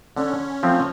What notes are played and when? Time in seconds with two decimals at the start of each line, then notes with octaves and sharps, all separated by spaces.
0.16 D3 C#4
0.63 F3 A3 C4